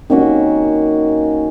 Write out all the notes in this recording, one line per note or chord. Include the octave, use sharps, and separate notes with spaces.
D#3 A#3 C#4 F#4